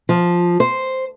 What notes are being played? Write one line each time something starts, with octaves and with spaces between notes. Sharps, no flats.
F3
C5